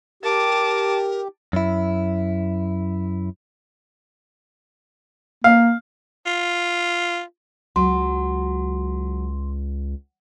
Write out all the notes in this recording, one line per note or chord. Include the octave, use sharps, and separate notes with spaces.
G4 A#4 A5 D6
F#2 E4
A#3 F5
F4
C#2 F#3 C6